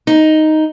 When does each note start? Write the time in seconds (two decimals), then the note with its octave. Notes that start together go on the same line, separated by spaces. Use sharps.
0.07 D#4